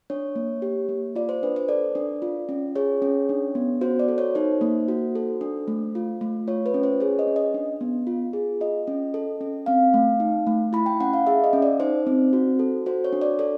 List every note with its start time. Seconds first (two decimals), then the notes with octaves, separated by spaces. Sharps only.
0.10 D4 C#5
0.36 A#3
0.62 G4
0.89 A#3
1.16 F4 D5
1.29 C5
1.43 D4 B4
1.56 C5
1.69 A4 D5
1.95 D4
2.22 F4
2.49 C#4
2.75 G#4 C#5
3.02 C#4
3.29 D4
3.55 B3
3.81 F#4 C5
3.99 D5
4.08 A4
4.18 C#5
4.35 D#4 C5
4.61 A#3
4.88 F#4
5.15 A4
5.41 D4
5.68 A3
5.95 F4
6.21 A3
6.48 F4 C#5
6.66 B4
6.74 C#4
6.83 C5
7.00 G#4 C#5
7.19 D#5
7.27 C#4
7.36 D#5
7.54 D4
7.81 B3
8.07 F4
8.33 G#4
8.61 F4 D#5
8.87 C#4
9.14 A4
9.41 C#4
9.66 C4 F5
9.94 A3
10.20 D#4
10.47 A3
10.73 E4 B5
10.86 G5
11.00 C#4 F#5
11.14 F5
11.27 G#4 E5
11.44 D#5
11.53 C#4
11.62 D5
11.80 D#4 C5
12.07 C4
12.33 F#4
12.59 A4
12.86 F#4 C5
13.04 C#5
13.13 D4
13.22 D5
13.39 A4 D5